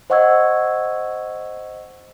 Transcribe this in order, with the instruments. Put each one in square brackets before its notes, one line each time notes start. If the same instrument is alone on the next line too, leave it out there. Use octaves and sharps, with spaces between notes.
[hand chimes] C5 D#5 F#5 C#6 E6 G#6